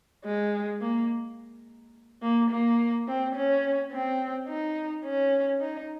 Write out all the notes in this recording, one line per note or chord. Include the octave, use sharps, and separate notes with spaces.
G#3
A#3
A#3
A#3
C4
C#4
C4
D#4
C#4
D#4